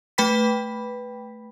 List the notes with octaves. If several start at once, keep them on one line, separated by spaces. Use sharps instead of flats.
A3 B4 G5 B5 B6